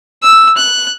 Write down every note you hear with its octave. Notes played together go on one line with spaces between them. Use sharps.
E6
F#6